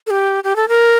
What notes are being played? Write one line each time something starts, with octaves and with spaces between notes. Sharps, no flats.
A4
G4
G4
A4
A#4